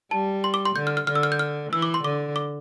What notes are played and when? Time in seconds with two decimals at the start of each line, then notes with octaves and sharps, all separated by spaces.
0.11 G3 A5
0.44 C6
0.54 D6
0.65 C6
0.75 D3 G6
0.87 F6
0.97 F6
1.07 D3 F6
1.15 E6
1.23 F6
1.32 G6
1.39 F6
1.72 E3 E6
1.82 D6
1.94 C6
2.04 D3 D6
2.36 D6